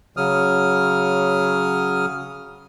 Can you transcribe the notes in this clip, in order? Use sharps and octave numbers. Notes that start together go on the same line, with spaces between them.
C#3 F#3 D#6 F6